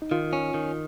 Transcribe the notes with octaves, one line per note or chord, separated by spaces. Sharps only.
D#4
D#3 F4
C#4
D#3